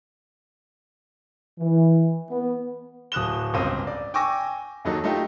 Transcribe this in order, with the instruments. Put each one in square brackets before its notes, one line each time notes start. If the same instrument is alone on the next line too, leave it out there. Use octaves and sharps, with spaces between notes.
[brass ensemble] E3
B3
[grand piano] D1 D#6 F#6 E7 G7
G1 C#2 C4 D#7
D5
G5 G#5 C#6 D6 E6 A#6
D#2 F#3 D#4 A4
A3 D#4 F4 G4